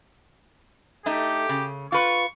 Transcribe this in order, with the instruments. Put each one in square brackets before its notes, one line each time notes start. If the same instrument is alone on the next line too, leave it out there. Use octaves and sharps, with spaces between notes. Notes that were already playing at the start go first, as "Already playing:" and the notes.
[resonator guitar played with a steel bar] A3 D#4 [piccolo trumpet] G4
[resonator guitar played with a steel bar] C#3
[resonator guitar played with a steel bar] F4 B4 [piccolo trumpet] C#6